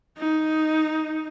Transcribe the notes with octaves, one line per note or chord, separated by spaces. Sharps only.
D#4